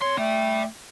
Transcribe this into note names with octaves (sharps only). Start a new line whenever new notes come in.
C3 C#5 C6
A3 D5 G5